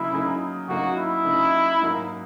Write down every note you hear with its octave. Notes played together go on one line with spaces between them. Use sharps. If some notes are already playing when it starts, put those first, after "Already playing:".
Already playing: C#3 F#3 A#3 D#4 E4
C#3 F#3 A#3 D#4
C#3 F#3 A#3 D#4 F#4
E4
C#3 F#3 A#3 D#4
G#2 F#3 A#3 D#4 A#4